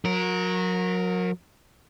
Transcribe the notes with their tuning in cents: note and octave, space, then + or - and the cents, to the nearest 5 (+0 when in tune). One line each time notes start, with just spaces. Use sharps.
F#3 -30 A#4 +0